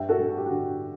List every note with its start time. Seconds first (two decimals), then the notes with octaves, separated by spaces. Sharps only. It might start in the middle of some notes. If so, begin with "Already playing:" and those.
Already playing: G2 E5 G5
0.09 F#4 A4
0.19 G2
0.30 F#4
0.37 G4
0.46 D3 F#4